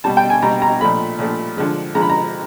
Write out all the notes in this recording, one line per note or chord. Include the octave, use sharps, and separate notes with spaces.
B2 G3 A5
G5
G#5
B2 G3 A#5
A#5
A#2 F3 A3 B5
A#2 F3 A3
D3 F3 G#3
D3 F3 G#3 A#5
B5
A#5